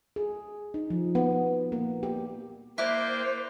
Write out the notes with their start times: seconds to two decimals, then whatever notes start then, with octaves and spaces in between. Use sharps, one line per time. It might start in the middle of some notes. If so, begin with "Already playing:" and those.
0.16 G#4
0.74 D#4
0.90 F3
1.15 B3
1.72 A#3
2.03 G4
2.78 A#3 E4 C5 D5 G5 D6 F#6 B6